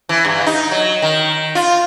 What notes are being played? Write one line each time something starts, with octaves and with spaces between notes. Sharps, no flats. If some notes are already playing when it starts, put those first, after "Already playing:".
E3
G2
D#4
F#3
D#3
F4